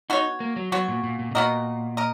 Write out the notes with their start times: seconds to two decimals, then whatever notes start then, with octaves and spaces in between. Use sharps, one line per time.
0.10 B3 D#4 F#4 C#5
0.40 A#3
0.56 F#3
0.72 F#3 B3 F#4 C#5
0.88 A#2
1.03 A#2
1.19 A#2
1.31 B2
1.35 A#2 B3 F#4 A#4 D#5
1.97 A#4 D#5